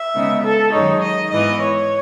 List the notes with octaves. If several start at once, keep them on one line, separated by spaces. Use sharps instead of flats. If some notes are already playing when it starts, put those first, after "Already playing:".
Already playing: E5
C#3 G#3 B3 D#4
A4
F#2 D#3 G#3 D#4 C#5
D#5
G#2 E3 B3 D#5
C#5